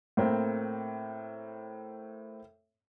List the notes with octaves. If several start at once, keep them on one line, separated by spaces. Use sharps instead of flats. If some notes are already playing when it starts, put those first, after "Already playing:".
A2 A#3 C4